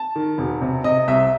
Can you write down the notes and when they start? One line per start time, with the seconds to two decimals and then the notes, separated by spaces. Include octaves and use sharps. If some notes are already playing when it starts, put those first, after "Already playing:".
Already playing: A5
0.16 D#3
0.38 E1
0.61 C3
0.84 C3 D#5
1.08 C2 E5